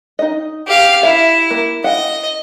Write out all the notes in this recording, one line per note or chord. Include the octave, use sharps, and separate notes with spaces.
D#4 D#5
G4 F5
E4 E5
A#3
D#5 F5 F#5